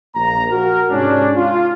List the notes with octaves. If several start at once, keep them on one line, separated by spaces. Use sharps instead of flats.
A#1 A#3 A#5
F#4 A#4
G#2 C3 C#4 D4
F4